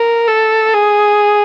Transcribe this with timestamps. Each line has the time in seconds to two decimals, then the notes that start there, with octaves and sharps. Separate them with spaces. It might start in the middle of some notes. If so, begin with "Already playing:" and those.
Already playing: A#4
0.28 A4
0.74 G#4